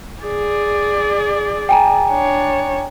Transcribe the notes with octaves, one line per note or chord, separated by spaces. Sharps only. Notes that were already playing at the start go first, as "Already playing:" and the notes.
G#4 D5
G5 G#5 A#5
D4 C#5